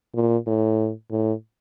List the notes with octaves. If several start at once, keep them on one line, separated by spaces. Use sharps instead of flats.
A#2
A2
A2